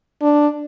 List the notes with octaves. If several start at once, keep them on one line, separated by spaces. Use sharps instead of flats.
D4